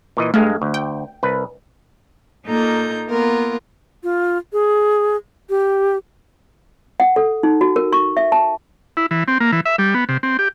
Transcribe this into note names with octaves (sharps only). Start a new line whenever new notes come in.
A#2 E3 D#5
G2 G#3 A3 F5
D2
G5
C2 B4
A#2 A#3 D#4 A4 A#5 G6
A#3 B3 F4 A#4
F4
G#4
G4
F#5
A4
D#4
F#4
A#4
C#6
E5
A5
E4
E3
C4
A#3
E3
E5
G3
B3
C3
C4
G4